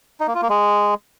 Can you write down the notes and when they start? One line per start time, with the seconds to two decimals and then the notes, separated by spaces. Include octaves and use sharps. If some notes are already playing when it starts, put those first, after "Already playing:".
0.20 D#4
0.27 A#3
0.35 F4
0.42 A#3
0.49 G#3